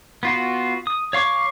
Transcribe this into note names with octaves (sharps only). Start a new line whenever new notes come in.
B3 F4 F#4
D#6
C#5 F5 C#6 D6